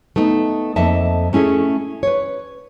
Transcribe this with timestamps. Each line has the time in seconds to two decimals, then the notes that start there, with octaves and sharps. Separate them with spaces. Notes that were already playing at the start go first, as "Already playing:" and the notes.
0.16 A3 B3 D#4
0.76 F2 A#3 A4 D#5 E5 A5
1.33 A3 C#4 E4 G#4 A4
2.03 B4 C#5